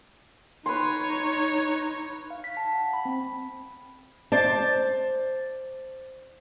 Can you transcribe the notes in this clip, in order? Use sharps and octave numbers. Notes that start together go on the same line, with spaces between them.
D#4 B4 C#5 C6
F5
B6
A5
F#5
B5
C4
C5 D5 A5